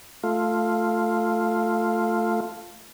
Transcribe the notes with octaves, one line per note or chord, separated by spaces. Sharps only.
A3 F4